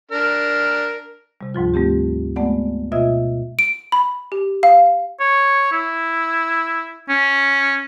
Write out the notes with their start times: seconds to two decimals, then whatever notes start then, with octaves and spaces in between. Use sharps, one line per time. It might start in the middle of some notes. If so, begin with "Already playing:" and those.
0.11 D4 A#4 F6
1.41 C3 G3
1.54 D2 G#2 F3 F4
1.74 G3 A3 C4 G4
2.36 G#3 A3 B3 D5 F#5
2.92 B2 F4 D#5 E5 E6 G#6
3.59 D7
3.92 B5
4.32 G4
4.63 F5
5.20 C#5
5.72 E4
7.09 C#4